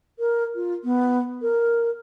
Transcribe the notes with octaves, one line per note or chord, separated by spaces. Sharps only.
A#4
F4
B3
A#4